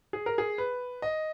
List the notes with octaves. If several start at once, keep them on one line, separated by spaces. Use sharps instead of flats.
G#4
A#4
G#4
B4
D#5